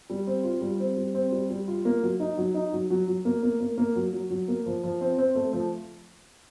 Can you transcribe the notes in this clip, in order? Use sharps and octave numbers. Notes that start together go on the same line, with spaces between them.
G3
C4
F4
G3
C4
G3
C4
G3
G3
F4
A#3
F#3
D#4
F#3
D#4
F#3
F#3
F#3
A#3
A#3
A#3
A#3
F#3
F#3
F#3
A#3
F3
F3
C4
C4
A3
F3